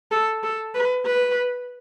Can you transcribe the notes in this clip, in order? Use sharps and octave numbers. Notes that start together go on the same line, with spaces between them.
A4
A4
B4
B4